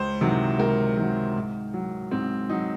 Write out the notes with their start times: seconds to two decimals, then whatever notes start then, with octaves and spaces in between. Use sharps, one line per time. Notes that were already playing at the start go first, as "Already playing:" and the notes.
Already playing: C#2 C5
0.21 C3 D#3 F#3
0.59 C#2 A#4
0.97 C3 D#3 F#3
1.36 G#2
1.74 F#3
2.11 G#2 C4
2.49 F#3 D#4